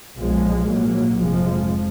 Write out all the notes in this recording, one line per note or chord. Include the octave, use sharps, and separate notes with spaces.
B1 A#2 F3 G#3
A#1 G#2 F#3 A#3
F1 F2 F3 G#3